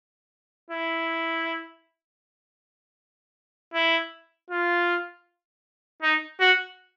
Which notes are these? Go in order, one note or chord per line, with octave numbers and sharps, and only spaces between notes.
E4
E4
F4
D#4
F#4